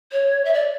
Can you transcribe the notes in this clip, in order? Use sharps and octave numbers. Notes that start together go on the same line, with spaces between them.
C#5
E5
D5